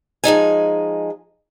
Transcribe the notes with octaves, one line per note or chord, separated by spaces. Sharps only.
F3 G#3 D#4 G#5